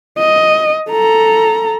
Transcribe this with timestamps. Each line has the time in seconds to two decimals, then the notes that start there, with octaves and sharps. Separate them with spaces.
0.18 D#5
0.91 A4 A#5